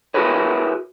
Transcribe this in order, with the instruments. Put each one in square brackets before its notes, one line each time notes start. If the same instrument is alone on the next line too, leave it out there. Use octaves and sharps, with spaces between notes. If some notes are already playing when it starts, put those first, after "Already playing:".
[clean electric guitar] E4 F#4 G#4 A#4 B4 C#5